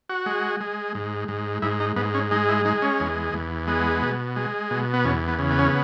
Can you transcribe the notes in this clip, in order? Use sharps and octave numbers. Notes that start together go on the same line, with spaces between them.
F#4
G#3
G#3
G#2
G#2
G#2 E4
D#4
G#2 B3
C#4
G#3 D#4
E4
G#3 D#4
C#4
E2
E2
G#3 B3
B2
G#3
B2
B3
E2 C#4
B3
C#3
B3
C#4
B3